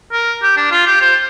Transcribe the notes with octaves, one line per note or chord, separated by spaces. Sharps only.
A#4
G4
D4
F4
G4
C5